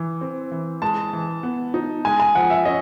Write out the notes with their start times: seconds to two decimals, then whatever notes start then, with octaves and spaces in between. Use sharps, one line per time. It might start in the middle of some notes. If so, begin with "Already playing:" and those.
Already playing: E3
0.21 C4
0.52 E3
0.82 G#3 A5
1.13 E3
1.43 B3
1.74 D#4
2.05 G#3 G#5
2.20 G#5
2.35 F3 F#5
2.50 E5
2.65 C#4 D#5